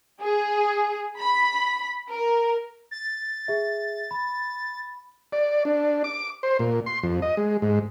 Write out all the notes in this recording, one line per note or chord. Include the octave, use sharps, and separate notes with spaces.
G#4
B5
A#4
A6
G#4 E5
B5
D5
D4
D6
C5
A#2
C6
F2
D#5
G#3
G#2